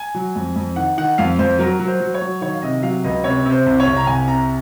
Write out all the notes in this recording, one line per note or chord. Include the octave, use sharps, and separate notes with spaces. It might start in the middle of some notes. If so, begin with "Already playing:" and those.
Already playing: G#5
F#3
F2
F2
D#3 F#5
D#3 F#5
F2 F5
F2 C5
F#3 A#4
F#3
C5
F#3
C#5
F#3
D#3 C#5
F5
C3 D#5
F#3 F5
C#2 D#5
C3 C#5
C3
C5
C2
C#5
C2
A#5
C2 G#5
C3 A#5